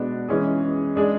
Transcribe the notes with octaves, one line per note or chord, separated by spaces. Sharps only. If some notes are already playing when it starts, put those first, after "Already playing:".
Already playing: B2 G#3 B3 D4 F#4
E3 G#3 C#4 G#4
G#3 D4 G#4 D5